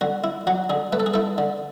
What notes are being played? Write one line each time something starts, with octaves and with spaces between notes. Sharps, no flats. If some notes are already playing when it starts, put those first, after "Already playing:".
D3 F#4
E4
F#3 F#4
D3 G#4
A3 B4
A4
G#4
E4 A4
D3